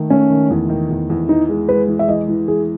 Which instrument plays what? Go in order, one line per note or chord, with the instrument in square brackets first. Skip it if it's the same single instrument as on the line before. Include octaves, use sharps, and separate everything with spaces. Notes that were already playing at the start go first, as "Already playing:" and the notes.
Already playing: [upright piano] D#3 A3
[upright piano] A3 [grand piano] C#4
[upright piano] D#3
E2
D#3
E2
E2
[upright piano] E3 [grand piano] D#4
[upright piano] G#3
[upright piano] G#3 [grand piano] B4
[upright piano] E3
[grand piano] E5
[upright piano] E3 [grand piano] D#5
[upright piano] E3
[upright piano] E3 [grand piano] G#4